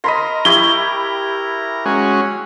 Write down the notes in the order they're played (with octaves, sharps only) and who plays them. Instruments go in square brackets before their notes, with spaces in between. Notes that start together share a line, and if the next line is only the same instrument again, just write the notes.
[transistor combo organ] A#4 [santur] D#5 B5 C6
[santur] E4 G4 C#6 [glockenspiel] G7
[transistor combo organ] G#3 C#4 F#4